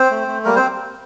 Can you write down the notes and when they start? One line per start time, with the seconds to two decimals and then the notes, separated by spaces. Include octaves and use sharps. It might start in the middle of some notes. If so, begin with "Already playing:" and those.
Already playing: C4 C5
0.10 A3
0.28 A3
0.45 G3 A#3 A#4
0.56 C4 C5